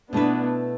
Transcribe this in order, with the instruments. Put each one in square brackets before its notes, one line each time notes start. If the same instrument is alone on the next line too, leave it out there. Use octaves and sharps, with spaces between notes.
[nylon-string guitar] B2 A3 E4 B4 [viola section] B3 D4